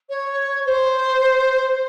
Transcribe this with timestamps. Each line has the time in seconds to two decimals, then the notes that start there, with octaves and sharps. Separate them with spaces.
0.09 C#5
0.65 C5